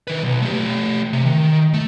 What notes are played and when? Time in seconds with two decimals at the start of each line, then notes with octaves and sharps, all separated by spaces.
0.07 D#3 B4
0.22 B1
0.42 A3 G4
1.13 C3
1.26 D#3
1.74 A3